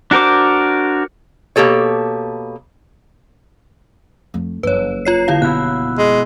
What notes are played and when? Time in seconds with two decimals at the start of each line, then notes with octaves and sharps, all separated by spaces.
0.11 D4 F#4 A#4 C5 D6
1.56 B2 A#3 G4 A4 C#5
4.34 F2 A3
4.63 F#1 F2 B4 C#5
5.05 F4 C#5 C7
5.28 D3 E4 F5
5.42 B2 E4 F#6
5.98 G#3